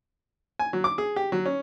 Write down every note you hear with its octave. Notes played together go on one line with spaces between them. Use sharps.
G#5
F#3
D6
G#4
G4
F#3
C#4